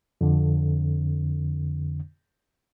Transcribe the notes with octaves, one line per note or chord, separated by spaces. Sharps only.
F2 D3